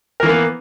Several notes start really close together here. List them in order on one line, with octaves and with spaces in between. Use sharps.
A#4 E3 A#3 B3